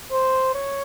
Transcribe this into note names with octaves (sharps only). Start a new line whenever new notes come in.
C5
C#5